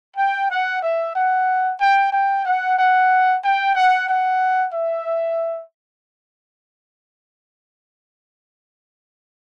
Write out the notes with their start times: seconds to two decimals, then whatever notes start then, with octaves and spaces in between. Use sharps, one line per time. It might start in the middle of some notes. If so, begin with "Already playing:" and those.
0.16 G5
0.49 F#5
0.82 E5
1.15 F#5
1.79 G5
2.12 G5
2.45 F#5
2.78 F#5
3.43 G5
3.75 F#5
4.08 F#5
4.73 E5